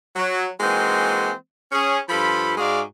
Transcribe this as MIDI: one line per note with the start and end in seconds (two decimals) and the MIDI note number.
0.16 0.46 54
0.60 1.31 52
0.60 1.31 56
0.60 1.31 58
0.60 1.31 60
0.60 1.31 63
0.60 1.31 66
1.72 1.99 61
1.72 1.99 68
2.09 2.52 43
2.09 2.52 53
2.09 2.52 65
2.09 2.52 69
2.09 2.52 83
2.57 2.81 44
2.57 2.81 56
2.57 2.81 66
2.57 2.81 68
2.57 2.81 74
2.57 2.81 77